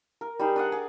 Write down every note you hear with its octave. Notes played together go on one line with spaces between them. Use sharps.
A#4
G3 D#4 G#4
D4 D#5 F#5
G#4 D6